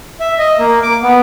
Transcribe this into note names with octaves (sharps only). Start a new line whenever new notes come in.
E5
D#5
A#3
D6
B3